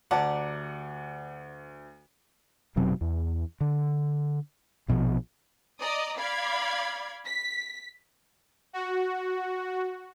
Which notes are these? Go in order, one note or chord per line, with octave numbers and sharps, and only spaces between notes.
D2 G4 D5 F#5 A5 A#5
F1 B2 F#3 C4
E2
D3
A#1 B2 D#3 F3
D5 D#5 A#5 D#6
D5 F5 B5 G#6
B6
F#4